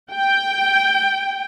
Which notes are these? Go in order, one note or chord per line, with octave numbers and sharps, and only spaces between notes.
G5